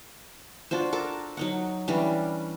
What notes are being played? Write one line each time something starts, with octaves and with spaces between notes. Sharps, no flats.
D4 F4 F#4 C5
A4 A#4 D6
F#3 D#4 F#5
E3 G3 C#4 D4